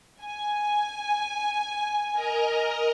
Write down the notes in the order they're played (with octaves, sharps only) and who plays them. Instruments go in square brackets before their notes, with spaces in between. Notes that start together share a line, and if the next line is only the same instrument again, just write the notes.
[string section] G#5
[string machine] A#4 D#5 A#5